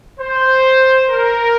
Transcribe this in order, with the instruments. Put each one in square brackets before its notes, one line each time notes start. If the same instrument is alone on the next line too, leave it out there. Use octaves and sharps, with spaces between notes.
[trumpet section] C5
A#4